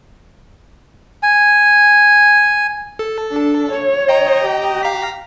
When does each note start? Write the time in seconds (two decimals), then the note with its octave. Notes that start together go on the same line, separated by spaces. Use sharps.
1.23 G#5
2.99 A4
3.31 D4
3.72 C#5
4.08 D#5 G5 A#5
4.45 G4
4.83 F5 A#5 B6